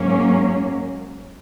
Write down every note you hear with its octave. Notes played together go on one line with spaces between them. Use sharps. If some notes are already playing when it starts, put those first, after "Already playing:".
Already playing: G#2 F#3 A#3 C#4